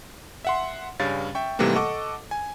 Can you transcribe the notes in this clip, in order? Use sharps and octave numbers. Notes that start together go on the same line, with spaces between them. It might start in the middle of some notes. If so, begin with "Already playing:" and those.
E5 F#5 C6
G2 C#3 G3 C#4 F5 A6
E5 G5 C#6
G#2 C3 E3 G3 A3 A#3
A4 D#5 F#5 C#6 D6
G#5